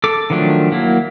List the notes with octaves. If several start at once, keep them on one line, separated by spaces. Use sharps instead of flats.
A4 D6
D#3 F3 F#3 A3 D4
F#3 A#3 E4